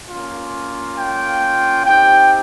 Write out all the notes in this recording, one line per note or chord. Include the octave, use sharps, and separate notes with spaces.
A#3 C#4 F4
G5
C4 D#4 G4 G5